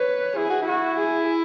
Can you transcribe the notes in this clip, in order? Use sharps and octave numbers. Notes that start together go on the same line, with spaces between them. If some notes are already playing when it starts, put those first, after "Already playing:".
Already playing: B4 C#5
E4 G#4
F#4
E4
F#4
G#4